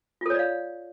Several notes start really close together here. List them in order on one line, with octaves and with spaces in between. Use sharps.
F4 A4 C#5 D5 F5